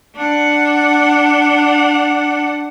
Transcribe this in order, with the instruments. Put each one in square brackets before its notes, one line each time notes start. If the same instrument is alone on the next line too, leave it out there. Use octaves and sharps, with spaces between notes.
[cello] D4 F#5